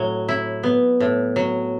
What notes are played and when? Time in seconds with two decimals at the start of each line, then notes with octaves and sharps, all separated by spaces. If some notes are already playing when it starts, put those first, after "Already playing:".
Already playing: A2 F#3
0.29 E4
0.63 B3
1.00 A2
1.36 F#3